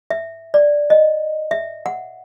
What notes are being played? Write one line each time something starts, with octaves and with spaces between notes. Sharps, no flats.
E5
D5
D#5
E5
F#5